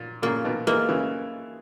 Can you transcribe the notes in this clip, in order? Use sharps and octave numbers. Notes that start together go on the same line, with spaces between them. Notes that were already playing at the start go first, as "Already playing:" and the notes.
Already playing: A#2
A#2 C#3 A#3
B2 D#3
E3 G#3 A#3
C#3 E3